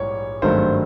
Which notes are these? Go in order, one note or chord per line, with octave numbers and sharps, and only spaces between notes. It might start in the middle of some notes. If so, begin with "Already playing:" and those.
Already playing: A#1 G#2 E3 G3 C#5
G#1 G2 D#3 F#3 A3 C5